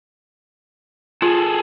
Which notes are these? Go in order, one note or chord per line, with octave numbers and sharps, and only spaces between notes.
F4 G#4 A4